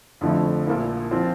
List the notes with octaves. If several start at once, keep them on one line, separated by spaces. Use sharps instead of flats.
F2 D3 F3 A3 E4
A#1 A#2 F3 A#3 E4
F3 C4 F4